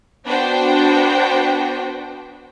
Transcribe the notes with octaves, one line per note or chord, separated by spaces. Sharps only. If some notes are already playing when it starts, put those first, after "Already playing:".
B3 D4 F#4 C5 G5